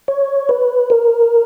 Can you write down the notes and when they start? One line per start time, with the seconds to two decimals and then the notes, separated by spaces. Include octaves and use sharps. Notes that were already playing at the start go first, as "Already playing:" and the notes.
0.08 C#5
0.49 B4
0.90 A#4